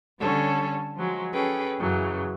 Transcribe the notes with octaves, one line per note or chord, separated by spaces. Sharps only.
D3 G3 C#4 A4 C#5
F3 F#3 G#3
C#4 G#4 A4 B4 G5
F#2 C#3 E3 F#3